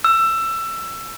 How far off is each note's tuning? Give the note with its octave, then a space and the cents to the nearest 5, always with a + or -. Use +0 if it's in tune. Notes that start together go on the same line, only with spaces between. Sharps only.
E6 +20